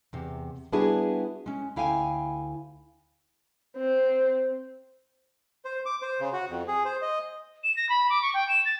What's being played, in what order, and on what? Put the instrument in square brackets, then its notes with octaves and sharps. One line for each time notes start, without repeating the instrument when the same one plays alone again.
[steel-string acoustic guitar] E2 C3
G3 B3 D4 E4 F#4 G#4
G#3 C#4
D2 E4 F5 G5 G#5
[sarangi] C4
[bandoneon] C5
D6
C5
C#3
F#4
F2
G#4
C5
D#5
[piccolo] E7
A#6
B5
D6
C#6
G5
E7
A6